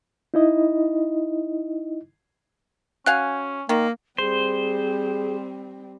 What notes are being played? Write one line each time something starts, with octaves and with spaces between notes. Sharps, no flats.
D#4 E4 D#5
C#4 F#4 F5 G#5 F#6
D#3 A#3
G3 C4 G#4 C5